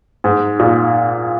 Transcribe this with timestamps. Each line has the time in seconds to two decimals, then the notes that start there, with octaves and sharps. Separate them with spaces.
0.24 G#2
0.59 A#2